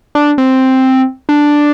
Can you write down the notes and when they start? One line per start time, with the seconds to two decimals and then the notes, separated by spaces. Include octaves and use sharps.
0.15 D4
0.38 C4
1.29 D4